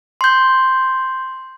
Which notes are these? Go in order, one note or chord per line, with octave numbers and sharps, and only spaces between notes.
C6 G6